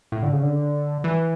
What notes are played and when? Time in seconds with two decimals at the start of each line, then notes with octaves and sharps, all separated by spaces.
0.12 A2
0.23 D3
0.33 C#3
0.43 D3
1.04 E3